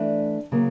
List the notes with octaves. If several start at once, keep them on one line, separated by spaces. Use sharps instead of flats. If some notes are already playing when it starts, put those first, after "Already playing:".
Already playing: E3 A3 D4
C#3 F#3 A#3